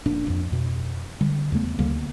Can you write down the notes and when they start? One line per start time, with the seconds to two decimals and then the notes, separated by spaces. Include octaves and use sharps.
0.05 F1 A#2 D4
0.27 D1 F2
0.51 F2 B2
1.21 D3 G3
1.52 E2 C#3 A3 B3
1.79 D2 C#3 G3 A#3